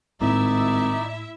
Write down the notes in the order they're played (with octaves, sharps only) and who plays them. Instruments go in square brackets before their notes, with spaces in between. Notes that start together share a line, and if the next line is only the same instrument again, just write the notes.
[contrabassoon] G#1 [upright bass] A2 A#3 [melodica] D#4 D5 [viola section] E4 E5